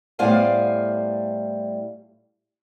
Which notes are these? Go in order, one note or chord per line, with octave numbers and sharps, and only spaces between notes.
A2 G3 B3 C5 F5 G#5